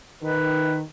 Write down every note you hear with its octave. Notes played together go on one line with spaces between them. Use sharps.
D#3 B4